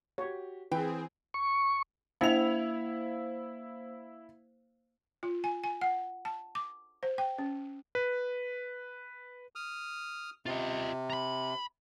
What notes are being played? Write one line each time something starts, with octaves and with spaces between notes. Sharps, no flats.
F#4 G4 C#5
E3 C4 G#4 B4 G5
C#6
A#3 E4 C5 F5 F7
F4
G#5
G#5
F#5
A5
D6
C5
G5
C#4
B4
D#6 F6
C3 F4 D#5
A#5 B5